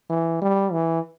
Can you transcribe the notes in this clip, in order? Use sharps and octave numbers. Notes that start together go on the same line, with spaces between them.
E3
G3
E3